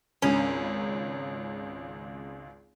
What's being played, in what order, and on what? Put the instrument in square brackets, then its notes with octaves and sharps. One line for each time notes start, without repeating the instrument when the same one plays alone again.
[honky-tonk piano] G#1 C#2 [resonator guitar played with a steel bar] C#4